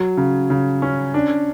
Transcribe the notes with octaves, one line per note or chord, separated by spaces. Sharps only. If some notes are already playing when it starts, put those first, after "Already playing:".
Already playing: F#3
C#3
C#3
C#4
D4